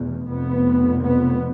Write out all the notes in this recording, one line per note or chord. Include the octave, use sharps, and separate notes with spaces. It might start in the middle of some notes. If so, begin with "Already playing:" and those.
Already playing: F1 E2 B2
F1 F2 C3 B3
B3